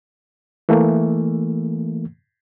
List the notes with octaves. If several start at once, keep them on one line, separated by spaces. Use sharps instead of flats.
E3 A3 A#3